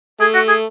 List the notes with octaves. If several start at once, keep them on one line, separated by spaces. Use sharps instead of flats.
A3 G#4
F#4
G#4